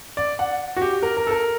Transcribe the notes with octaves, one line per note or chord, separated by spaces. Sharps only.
D5
F#5
F#4
G4
A#4
A#4
A4
A#4